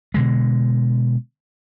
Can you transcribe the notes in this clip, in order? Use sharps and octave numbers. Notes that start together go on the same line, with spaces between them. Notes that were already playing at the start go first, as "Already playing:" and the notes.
B2 D3 G#3